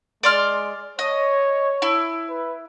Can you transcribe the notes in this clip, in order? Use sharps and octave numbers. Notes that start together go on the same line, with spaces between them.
G#3 D5 C6 F6
C#5 D#5
E4
B4